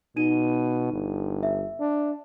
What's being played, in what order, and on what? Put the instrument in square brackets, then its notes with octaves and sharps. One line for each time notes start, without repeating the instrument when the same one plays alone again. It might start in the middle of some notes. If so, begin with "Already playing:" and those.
[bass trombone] B2 [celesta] D#4 D#7
[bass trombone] G1
[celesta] E5
[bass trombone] D4